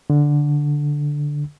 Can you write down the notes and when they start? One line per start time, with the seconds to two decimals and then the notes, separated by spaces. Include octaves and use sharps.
0.10 D3